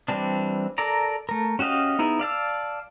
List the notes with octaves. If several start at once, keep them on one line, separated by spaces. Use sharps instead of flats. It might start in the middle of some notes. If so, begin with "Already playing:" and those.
E3 G3 C4 D4
A4 A#4 D5 A#5
A3 A#4
C#4 F#4 G4 D#5 F5
B3 D#4 E4 G#4
D5 F5 A5 E6